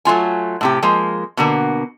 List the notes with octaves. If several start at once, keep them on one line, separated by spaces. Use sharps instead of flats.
F#3 A3 F4 G#5
A2 C3 G4
F3 G#3 A#3
B2 D3 A#3